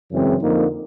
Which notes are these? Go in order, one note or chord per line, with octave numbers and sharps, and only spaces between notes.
F#2 C#3 E3 G#3 C4
F2 D3 F3 A#3 D#4